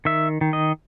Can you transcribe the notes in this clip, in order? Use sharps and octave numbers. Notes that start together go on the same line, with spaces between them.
D#3 E5
D#3
D#5